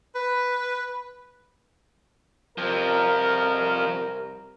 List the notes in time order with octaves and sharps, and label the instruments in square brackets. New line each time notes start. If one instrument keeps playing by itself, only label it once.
[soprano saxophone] B4
[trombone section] C2 A#4 [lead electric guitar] F2 F3